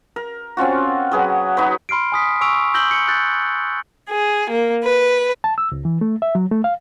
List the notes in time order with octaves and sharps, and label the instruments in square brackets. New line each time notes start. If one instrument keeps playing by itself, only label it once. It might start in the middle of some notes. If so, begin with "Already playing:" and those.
[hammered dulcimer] A#4
C4 C#4 F4 F#4
F#3 G#4 B4
D#4 F#4 B4
[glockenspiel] B5 C6 F6 C7 D7
G#5 D#6 B6
G#5 C#6 E6 D7 F7
E6 G6 A#6 F#7 G7
C#7
F#6 G6 A6
[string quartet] G#4
A#3
B4
[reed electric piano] A5
E6
C#2
E3
A3
E5
F#3
A3
F5